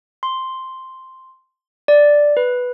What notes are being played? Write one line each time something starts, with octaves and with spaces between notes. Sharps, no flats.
C6
D5
B4